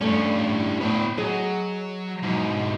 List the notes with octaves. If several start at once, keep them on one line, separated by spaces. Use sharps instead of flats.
G2 G3 A3 C#4 D4
A2
D2 A2 B3 G5
F#3 G#4 D#5
G#2 B2